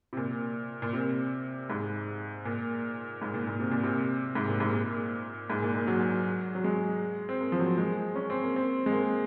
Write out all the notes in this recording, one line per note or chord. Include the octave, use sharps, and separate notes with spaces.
C3
A#2
A#2
C3
G#2
A#2
G#2
A#2
A#2
C3
A#2
C3
G#2
A#2
G#2
A#2
G#2
A#2
A#2
F#3
F#3
G#3
C4
A#3
F3
F#3
G#3
C#4
C4
A#3
C4
G#3
A#3